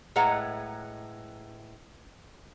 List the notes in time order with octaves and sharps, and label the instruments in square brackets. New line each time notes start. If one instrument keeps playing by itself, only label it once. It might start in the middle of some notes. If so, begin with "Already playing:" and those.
[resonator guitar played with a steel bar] A2 G#3 B4 F#5 A#5